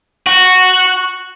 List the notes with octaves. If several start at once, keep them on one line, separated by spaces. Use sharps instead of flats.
F#4